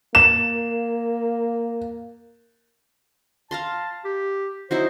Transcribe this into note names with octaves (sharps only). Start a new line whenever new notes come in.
A#3 E7
F5 A5 A#5 C6
G4
F#3 D#4 E4 C5